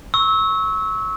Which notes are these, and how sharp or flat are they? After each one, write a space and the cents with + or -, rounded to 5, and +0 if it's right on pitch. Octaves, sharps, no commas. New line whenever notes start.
C#6 -10 E6 -25